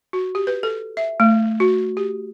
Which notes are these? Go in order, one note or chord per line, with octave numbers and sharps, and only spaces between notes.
F#4
G4
B4
A4
E5
A3
F#4
G4